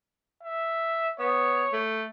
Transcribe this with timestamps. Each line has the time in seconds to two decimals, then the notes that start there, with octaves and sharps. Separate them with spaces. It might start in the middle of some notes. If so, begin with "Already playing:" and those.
0.44 E5
1.19 B3 C#5
1.73 A3